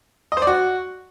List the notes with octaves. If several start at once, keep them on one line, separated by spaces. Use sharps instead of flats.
D#5
C5
D5
F#4